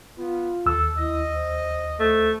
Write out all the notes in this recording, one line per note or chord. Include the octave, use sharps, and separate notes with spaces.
B3 F4
D#2 A4 E6
E4 D#5
C5
A3 C5